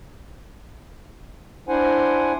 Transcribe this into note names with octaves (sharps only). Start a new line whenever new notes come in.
D4 E4 C5 F#5 G#5